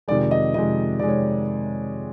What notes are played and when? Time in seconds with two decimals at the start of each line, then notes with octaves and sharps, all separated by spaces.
0.08 F2 C3 D#3 G#3 D5
0.31 D#5
0.54 F2 C3 D#3 G#3 D#5
0.99 C3 D#3 G#3 D5
1.09 C#5